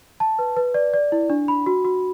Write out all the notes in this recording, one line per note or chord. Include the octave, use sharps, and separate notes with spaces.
A5
B4
B4
D5
D5
E4
D4
B5
F#4
F#4